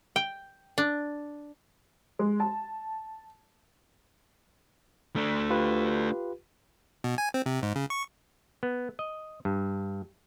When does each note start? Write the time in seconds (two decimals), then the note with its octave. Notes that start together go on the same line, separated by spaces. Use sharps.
0.16 G5
0.78 D4
2.19 G#3
2.40 A5
5.16 A3 D4
5.50 F4 G4 B4
7.04 B2
7.18 G#5
7.34 C4
7.46 C3
7.63 G#2
7.75 C#3
7.90 C#6
8.63 B3
8.99 D#5
9.45 G2